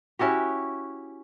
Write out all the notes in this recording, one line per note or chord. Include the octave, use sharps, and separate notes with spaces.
C#4 E4 F#4 G4